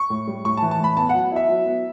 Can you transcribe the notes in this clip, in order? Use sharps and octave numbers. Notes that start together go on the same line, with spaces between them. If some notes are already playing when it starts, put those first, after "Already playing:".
Already playing: C#6
A2
G3
A2 C#6
A5
E3
A5
A2 B5
B3 A5
F#5
F#3
E4 E5
F#3
B3